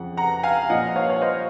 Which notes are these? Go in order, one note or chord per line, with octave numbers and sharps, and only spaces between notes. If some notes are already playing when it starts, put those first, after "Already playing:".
Already playing: F2 C#3 F3 F#5
F#5 A#5
F5 G#5
A#2 F3 D#5 F#5
C#5 F5
C#5
C5 D#5